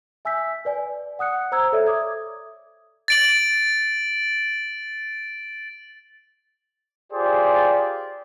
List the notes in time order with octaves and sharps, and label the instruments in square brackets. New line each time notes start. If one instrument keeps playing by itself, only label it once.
[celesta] E5 G#5 E6 G6 B6
B4 D5 G#5
F#5 D#6 F#6 C#7
C5 A#5 E6 G#6
A4 C#5 D5 E5
E5 D6 D#6 G#6
[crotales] A6 D7 F#7
[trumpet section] F4 G4 G#4 C5 D5